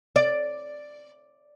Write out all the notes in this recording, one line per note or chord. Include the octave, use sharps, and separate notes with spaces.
D5